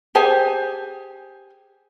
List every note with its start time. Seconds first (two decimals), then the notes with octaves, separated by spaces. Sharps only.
0.15 G4 G#4 C5 G#5